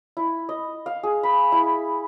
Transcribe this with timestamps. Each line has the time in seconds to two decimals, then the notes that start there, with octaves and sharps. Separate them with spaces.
0.17 E4
0.49 D#5
0.86 F5
1.03 G#4
1.23 B5
1.52 E4